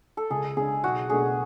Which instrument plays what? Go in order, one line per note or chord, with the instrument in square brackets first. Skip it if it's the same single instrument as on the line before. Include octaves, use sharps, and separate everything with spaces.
[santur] A4
[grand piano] C#2 [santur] G#4
[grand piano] C#3 G#3 D4 [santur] G#4
[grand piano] B1 [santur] F#4
[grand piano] B2 A3 D4 [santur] G#4